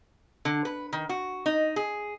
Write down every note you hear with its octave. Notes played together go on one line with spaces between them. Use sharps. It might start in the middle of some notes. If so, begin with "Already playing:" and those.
D3
B4
D#3
F#4
D#4
G#4